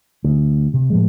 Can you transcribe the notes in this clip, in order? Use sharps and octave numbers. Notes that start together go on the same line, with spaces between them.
D2
C3
A2 F3 G#3